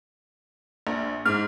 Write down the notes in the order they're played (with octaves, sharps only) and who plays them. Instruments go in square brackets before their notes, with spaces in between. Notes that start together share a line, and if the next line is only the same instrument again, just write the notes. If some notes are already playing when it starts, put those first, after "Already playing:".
[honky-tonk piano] A#1
[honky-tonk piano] G#2 [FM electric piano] F6